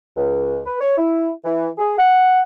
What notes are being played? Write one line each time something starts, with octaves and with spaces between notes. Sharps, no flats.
C#2
B4
C#5
E4
E3
G#4
F#5